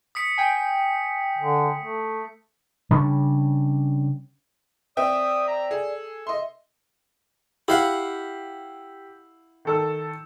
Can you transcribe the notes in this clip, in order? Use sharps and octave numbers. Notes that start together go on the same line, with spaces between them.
D#6 B6 C#7
G5 G#5
D3
A3
C#3 G3 C#4 D4
C4 D5 E5 G5 D#6
A#5
G#4 A4
D#5 E5 C6
E4 G4 F5 F#5
D#3 A4 E6